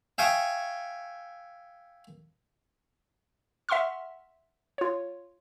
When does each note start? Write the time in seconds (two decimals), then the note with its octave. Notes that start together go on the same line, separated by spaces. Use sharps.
0.18 E5 F5 G5 G#5 C#6 D#6
3.69 E5 F#5 C6 C#6 F6
4.78 F4 C#5